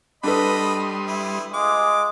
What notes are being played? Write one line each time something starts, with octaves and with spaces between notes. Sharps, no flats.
G3 D4 A4 B4 D#5 B5 C6 D#6
E4
G#3 F4 D6